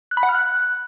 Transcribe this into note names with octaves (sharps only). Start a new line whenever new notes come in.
F#6
B5
F#5
F6
F#6